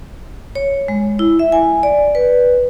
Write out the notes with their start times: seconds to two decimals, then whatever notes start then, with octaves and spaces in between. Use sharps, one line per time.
0.55 C#5
0.88 G#3
1.19 E4
1.39 E5
1.52 G#5
1.83 D5
2.15 B4